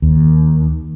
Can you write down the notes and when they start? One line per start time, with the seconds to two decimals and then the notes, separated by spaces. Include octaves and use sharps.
0.02 D#2